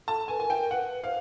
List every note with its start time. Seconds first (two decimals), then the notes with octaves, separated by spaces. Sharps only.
0.08 A4 A5
0.28 B4 G#5
0.39 A#4 G#5
0.50 G5
0.71 B4 F#5
1.03 C5 F5